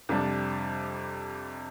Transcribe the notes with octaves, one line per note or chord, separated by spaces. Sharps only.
F2 C3 G3 D4